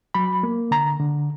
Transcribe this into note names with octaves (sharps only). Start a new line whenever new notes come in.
F#3 B5
A#3
D3 A#5
D3